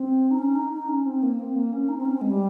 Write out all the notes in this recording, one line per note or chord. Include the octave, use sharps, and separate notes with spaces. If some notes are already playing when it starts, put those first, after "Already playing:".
Already playing: C4
D#4
C#4
D#4
D#4
C#4
C4
A#3
C4
A#3
C#4
D#4
C4
C#4
C4
G#3
G3